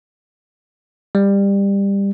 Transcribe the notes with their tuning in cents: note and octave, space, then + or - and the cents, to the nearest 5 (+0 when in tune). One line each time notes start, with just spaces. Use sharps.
G3 +20